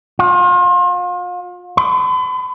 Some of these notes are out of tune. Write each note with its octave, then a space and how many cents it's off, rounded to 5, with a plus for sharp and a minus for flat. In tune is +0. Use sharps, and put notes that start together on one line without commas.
F4 +35
B5 +45